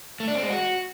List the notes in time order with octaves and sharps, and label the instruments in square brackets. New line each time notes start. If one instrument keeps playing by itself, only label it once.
[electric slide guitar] A3
D4
C4
G#3
F#4